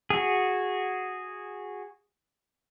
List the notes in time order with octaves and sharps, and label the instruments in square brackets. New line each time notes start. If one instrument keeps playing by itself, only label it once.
[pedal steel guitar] F#4 G#4